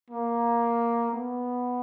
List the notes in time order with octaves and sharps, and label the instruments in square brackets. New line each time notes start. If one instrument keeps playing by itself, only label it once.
[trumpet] A#3
B3